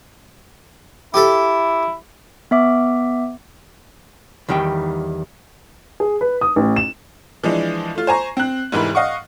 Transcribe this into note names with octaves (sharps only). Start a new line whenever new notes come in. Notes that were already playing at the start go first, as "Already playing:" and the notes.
E4 G4 A4
B3 E5 D6
E2 D#3 G3 D#4 G5
G#4
B4
D#6
A1
E7
E3 F3 G#3 D4
A3 F4
C5 G#5 A#5 C#6
C4 F#6
F1 G#2 E3 A#4 B5
D#5 F5 F#5 C#6